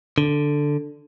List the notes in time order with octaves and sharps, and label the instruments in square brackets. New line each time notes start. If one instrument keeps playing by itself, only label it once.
[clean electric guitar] D3